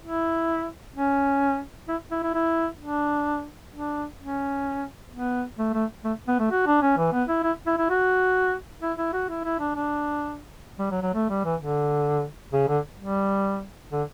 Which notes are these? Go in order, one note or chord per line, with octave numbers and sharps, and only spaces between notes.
E4
C#4
E4
E4
E4
E4
D4
D4
C#4
B3
A3
A3
A3
B3
A3
F#4
D4
C#4
E3
B3
E4
E4
E4
E4
F#4
E4
E4
F#4
E4
E4
D4
D4
G3
F#3
F#3
A3
G3
E3
D3
C#3
D3
G3
D3